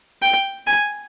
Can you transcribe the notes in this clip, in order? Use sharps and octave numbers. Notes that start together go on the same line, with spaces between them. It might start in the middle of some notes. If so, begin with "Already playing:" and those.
G5
G#5